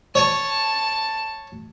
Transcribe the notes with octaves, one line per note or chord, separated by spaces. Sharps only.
C#5 A5